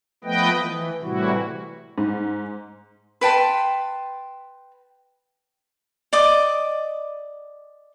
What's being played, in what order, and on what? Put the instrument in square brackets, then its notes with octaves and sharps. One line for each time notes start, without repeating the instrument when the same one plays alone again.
[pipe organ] F3 A3 B3 B4 D#5 G5
E3
A2 C3 E3 G3 E4 F#4
[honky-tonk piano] G#2
[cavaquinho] B4 G5 A5 C6
D5 D#5 D6